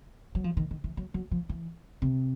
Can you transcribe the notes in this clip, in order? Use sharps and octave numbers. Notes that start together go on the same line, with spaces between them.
F#3
F3
D#3
D#3
E3
F#3
F#3
F3
E3
C3